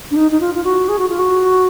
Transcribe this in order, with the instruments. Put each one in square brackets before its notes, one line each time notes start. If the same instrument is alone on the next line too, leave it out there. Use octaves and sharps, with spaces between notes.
[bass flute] D4
D#4
D#4
F4
F4
F#4
G#4
F#4
F4
F#4